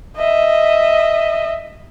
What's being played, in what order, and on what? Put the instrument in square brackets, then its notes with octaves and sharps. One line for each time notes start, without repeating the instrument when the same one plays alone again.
[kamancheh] D#5 E5